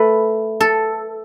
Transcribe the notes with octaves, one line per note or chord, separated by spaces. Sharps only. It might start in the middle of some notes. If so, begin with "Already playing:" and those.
Already playing: A3 A4 B4
A4